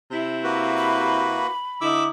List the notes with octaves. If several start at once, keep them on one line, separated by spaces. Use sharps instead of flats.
C3 E4
A#3 F#4 B4
B5
D3 D#4 E4 D6 E6